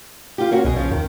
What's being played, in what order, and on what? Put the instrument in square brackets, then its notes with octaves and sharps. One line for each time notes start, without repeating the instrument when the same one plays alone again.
[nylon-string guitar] F4 G4
A#3 C#4 F#4
[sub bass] B1 [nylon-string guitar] B2 G#4
[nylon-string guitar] C#3 F3
[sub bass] D#2 [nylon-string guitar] D#3